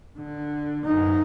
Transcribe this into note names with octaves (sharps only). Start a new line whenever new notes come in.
D3
F#2 D#4